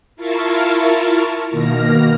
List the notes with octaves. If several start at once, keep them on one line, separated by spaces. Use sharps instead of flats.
E4 F4 A#4 F5 A5 C#6
B2 D#3 A#3 F6 A#6